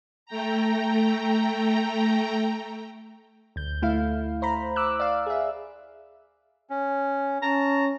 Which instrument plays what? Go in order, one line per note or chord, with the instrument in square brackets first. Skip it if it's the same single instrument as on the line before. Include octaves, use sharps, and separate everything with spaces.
[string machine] A3 G5 A#5
[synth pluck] D2 G6
D2 A3 E4 F5
C5 A#5 B5
D6 E6 F#6
D5 F5
G#4 E5
[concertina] C#4
[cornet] C#4 [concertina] A5 [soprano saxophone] A#5